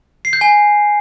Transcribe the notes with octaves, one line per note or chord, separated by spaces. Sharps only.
C7
G6
G#5